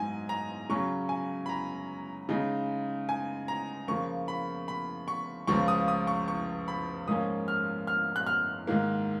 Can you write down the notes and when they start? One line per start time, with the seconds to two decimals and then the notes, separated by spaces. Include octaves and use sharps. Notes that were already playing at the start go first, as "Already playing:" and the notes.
Already playing: G#2 F#3 D#4 G#5
0.29 A#5
0.69 C#3 F#3 C#4 C#6
1.09 G#5
1.46 B5
1.49 A#5
2.29 C#3 G#3 D#4
3.09 G#5
3.48 A#5
3.88 C#3 F3 A#3 C#6
4.28 B5
4.68 B5
5.08 C#6
5.47 C#2 C#3 F3 C#6
5.68 D#6
5.88 D#6
6.07 C#6
6.28 C#6
6.68 B5
7.08 G#2 F3 A#3 C#4 D#6
7.48 F6
7.87 F6
8.16 F#6
8.27 F6
8.67 G#2 D#3 A#3